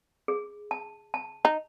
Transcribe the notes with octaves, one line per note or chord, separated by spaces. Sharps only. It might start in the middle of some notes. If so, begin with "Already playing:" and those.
G#4
A5
A5
D#4